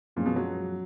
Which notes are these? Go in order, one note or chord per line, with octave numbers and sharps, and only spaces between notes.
F#2 A#2 F3 G#3 C#4 F4
B2
F#3